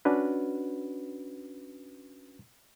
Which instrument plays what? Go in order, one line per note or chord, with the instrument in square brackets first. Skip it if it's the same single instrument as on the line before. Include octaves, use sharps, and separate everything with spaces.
[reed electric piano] C#4 D4 F#4 B4